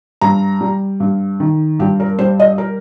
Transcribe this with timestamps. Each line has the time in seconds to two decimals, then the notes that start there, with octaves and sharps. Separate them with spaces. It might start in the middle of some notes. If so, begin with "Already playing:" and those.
0.21 G2 A#5
0.61 G3
1.00 G2
1.40 D#3
1.79 G2 G4
2.00 A#4
2.19 G3 C5
2.40 D#5
2.58 A#4